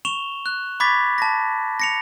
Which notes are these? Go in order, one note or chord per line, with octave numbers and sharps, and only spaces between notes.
C#6 E7 F7 G7
F#6
B5 C#6 D6 G#6 A6 B6
A5 A#6
A#6 C#7 F7